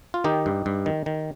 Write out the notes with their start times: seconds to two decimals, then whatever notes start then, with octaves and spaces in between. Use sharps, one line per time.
0.14 F4
0.24 D#3 D#4 G4
0.46 G2
0.66 G2
0.86 D#3
1.06 D#3